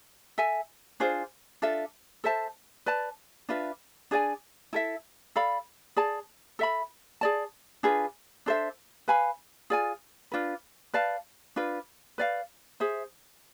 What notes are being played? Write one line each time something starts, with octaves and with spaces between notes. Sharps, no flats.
A4 E5 G#5
D4 F4 G#4 C5
D4 F4 A4 E5
A4 C5 E5 A5
B4 D5 A5
D4 F4 B4 E5
D4 G#4 D5 G#5
E4 A4 E5
A4 D5 F5 B5
G#4 D5 A5
A4 E5 B5
G#4 D5 A5
D4 F4 G#4 B4
D4 A4 C5 E5
B4 F5 G#5 B5
F4 G#4 D5 G#5
D4 F4 B4
B4 D5 F5 A5
D4 F4 B4
B4 D5 F5
G#4 C5 E5